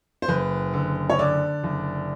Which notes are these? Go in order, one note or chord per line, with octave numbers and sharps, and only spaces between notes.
C5
F#1 B4
D3
C#5
D3 D5
F#1